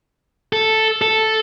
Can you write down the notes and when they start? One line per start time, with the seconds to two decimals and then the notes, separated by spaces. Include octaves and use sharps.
0.53 A4
1.02 A4